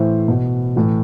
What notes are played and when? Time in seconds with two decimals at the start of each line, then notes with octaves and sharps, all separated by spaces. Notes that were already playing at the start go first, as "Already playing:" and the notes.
Already playing: A2 E3 C5 E5
0.28 B2
0.76 A2 E3